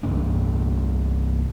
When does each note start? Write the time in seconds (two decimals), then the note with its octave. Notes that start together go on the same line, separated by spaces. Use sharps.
0.03 C2 G2 B3 D4